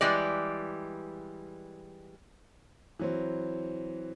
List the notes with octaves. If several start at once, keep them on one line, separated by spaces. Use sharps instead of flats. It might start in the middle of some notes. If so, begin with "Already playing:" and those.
E3 G3 G#3 D5
E3 F#3 C4